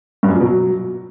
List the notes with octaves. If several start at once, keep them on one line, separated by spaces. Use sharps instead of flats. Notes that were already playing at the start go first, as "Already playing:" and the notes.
G2
F#2
A#2
B2
F#3